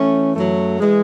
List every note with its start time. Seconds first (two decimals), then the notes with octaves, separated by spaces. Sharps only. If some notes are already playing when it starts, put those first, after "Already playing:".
Already playing: E3 A3 C#4
0.36 F#2 F#3 A3
0.80 E3 G#3